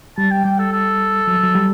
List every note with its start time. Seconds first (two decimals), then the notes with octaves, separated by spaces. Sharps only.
0.18 G3 A5
0.31 G5
0.45 G3 G5
0.59 A4
0.72 A4
1.27 F#3
1.43 F#3
1.55 G3